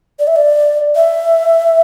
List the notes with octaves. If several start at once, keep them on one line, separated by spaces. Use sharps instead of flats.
D5
E5
D5
E5